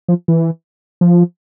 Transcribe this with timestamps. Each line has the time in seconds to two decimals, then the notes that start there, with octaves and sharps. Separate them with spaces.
0.09 F3
0.28 E3
1.01 F3